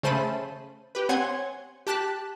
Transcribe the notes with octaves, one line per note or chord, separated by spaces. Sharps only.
C#3 A3 C5 A5 B5 D#7
G4 B4
C4 C#5 F#5 G#5 C6 G#6
G4 A5 F#6 B6